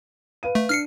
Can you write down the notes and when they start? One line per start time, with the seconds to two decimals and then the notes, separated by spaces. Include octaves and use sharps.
0.43 B4 F5 D#7
0.55 A3
0.69 D4 F6 C7 C#7